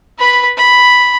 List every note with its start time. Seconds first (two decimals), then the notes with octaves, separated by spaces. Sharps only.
0.19 B4 B5
0.57 B5